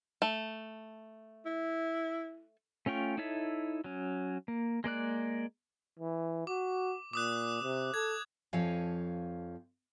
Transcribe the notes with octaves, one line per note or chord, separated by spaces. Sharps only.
A3
E4
A3 C#4 F4 G5 C#6
D#4 E4 A4 C#5 E5
F#3 C#4
A#3
G#3 A#3 D5 F#6
E3
F#4 D6
A#2 D6 D#6 F#6
C3
A4 G#6
F2 F3 C#5 F5 G#5